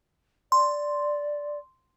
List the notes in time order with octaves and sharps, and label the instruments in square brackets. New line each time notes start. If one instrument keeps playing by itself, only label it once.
[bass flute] D5 [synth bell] C6